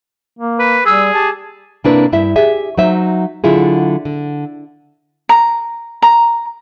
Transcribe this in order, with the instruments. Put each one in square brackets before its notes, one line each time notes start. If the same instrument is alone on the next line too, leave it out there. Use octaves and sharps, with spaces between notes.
[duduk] A#3
[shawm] B4
[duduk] G3 [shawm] G#4 [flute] E6
[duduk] G4 [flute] A5
[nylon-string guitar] C3 A#3 C4 D4 E4 B4
G2 E4 E5
G4 G#4 E5
F#3 D#4 C5 E5
D3 F#3 E4 F4 G#4
D3
[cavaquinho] A#5
A#5